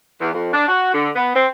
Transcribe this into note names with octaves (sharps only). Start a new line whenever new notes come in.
E2
F2
D4
F#4
D3
B3
C4